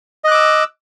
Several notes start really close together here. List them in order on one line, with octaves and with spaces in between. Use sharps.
D#5 F#6 D6 E6